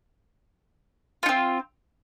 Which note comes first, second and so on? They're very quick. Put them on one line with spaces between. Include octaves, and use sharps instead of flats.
F4 D#4 C4